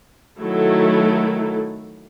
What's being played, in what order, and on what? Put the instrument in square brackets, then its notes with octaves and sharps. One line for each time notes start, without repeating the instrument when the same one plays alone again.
[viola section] D#3 F#3 A3 E4 A4